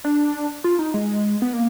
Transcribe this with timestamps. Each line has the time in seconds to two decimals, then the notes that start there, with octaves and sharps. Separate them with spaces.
0.04 D4
0.64 F4
0.79 D#4
0.94 G#3
1.42 B3
1.53 A#3